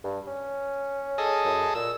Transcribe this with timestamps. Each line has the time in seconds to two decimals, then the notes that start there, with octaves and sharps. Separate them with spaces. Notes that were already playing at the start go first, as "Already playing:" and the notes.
0.04 G2
0.27 C#4
1.18 G#4 A4 D#5
1.45 F#2
1.75 A#2 E6